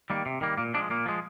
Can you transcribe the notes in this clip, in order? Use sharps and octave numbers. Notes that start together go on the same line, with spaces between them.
D#3 G3 A#3
C3
D#3 G3 A#3
A#2 A#3
F3 G#3 D4
A#2 A#3
F3 G#3